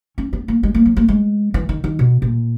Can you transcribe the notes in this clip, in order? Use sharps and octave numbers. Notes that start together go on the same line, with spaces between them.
C#4
B3
A#3
G#3
A#3
F#3
A#3
G#3
E3
D#3
D#3
B2
A#2